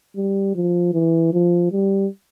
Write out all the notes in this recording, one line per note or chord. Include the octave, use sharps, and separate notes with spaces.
G3
F3
E3
F3
G3